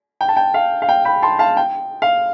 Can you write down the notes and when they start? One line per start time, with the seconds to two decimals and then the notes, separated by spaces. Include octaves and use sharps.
0.21 G5
0.29 A5
0.37 G5
0.54 F5
0.82 F5
0.89 G5
1.05 G5 B5
1.22 A5 C6
1.39 F5 A5
1.57 G5
2.02 F5